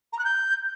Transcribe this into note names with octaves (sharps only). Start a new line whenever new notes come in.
A#5
F#6
G6